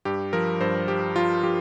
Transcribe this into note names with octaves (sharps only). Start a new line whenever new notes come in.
G2 G4
F3 A#4
G2 C5
F3 G4
F3 F4
F3 G4